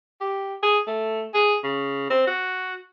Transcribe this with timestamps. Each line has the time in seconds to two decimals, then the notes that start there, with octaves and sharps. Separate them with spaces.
0.21 G4
0.63 G#4
0.87 A3
1.34 G#4
1.64 C#3
2.10 C4
2.27 F#4